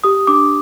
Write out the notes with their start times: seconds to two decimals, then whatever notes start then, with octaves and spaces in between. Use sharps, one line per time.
0.04 G4 D#6
0.27 D4 D6